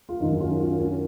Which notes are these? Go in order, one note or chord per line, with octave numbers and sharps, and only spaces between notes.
F4
F#2 D#3 F#3 D#4
C#4 F4
C#4 F4
C#4 F4